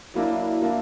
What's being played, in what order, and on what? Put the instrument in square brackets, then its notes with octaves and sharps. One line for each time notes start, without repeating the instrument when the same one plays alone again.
[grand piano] F#3 A#3 D4 [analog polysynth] E4
[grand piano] F#3 A#3 D4